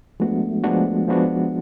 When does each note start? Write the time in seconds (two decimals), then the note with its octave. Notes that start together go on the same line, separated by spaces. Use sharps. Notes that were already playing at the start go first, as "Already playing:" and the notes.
0.20 F3 G#3 A3 B3 D4 F#4
0.64 F3 G#3 B3 D4 F#4
1.08 F3 G#3 B3 D4 F#4